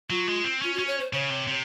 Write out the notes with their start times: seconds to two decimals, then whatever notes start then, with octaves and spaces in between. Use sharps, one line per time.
0.10 F#3 F4
0.28 G#3
0.44 C4
0.62 C#4 F4
0.74 F#4
0.78 C#4
0.87 C#5
1.00 C5
1.13 C#3 C#5
1.30 C3
1.47 C3